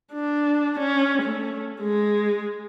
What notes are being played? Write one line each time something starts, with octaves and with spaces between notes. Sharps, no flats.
D4
C#4
A3
G#3